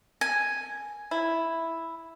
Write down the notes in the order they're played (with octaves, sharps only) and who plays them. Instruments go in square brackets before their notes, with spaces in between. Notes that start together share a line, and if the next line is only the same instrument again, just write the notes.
[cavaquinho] G#5
[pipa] E4